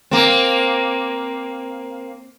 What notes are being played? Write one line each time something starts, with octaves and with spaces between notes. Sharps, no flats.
A#3 C4